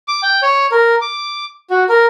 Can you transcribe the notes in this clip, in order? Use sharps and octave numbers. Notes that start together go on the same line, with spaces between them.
D6
G5
C#5
A#4
D6
F#4
A#4